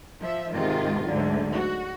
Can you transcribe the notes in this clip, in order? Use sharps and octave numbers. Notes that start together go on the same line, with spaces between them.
F3 E5
G#2 C3 D#3 G#3 F4
D2 G#2 D3 F#3
F#4